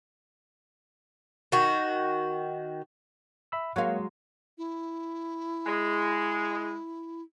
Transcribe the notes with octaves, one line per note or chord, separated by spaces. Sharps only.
D#3 F#4
E5 B5 E6
F#3 G#3 A#3 C#5 F5 F#5
E4
G#3